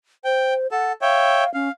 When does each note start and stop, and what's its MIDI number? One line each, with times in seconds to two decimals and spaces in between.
0.24 0.67 72
0.24 0.54 79
0.72 0.93 69
0.72 0.92 78
0.72 0.93 81
1.02 1.44 73
1.02 1.44 76
1.02 1.53 77
1.02 1.44 79
1.54 1.69 61
1.54 1.71 77